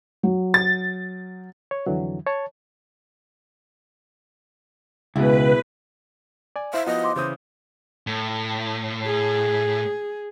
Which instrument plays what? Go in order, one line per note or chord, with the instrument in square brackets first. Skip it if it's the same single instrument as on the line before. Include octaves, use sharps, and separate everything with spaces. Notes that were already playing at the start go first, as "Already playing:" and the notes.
[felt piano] F#3
[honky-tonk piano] A6
[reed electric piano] C#5
F2 D3 E3 F#3
C#5 A5
[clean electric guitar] C#2 [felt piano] B2 G#3 E4 [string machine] B4
[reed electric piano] D5 G#5
[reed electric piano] E4 C5 F5 [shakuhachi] E5
[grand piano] F3 B3 F#4 [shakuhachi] D#5
[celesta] C6 D6
[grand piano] C#3 E3 D#6 [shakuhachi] C5
[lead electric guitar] A2
[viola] G#4